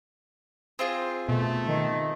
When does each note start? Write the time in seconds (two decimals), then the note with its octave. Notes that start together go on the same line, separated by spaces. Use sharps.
0.79 C4 F4 G#4
1.28 B2 A3
1.65 D#3